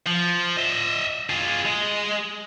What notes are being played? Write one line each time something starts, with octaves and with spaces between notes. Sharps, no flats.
F3
D#5 E5
F4 G#4
G#3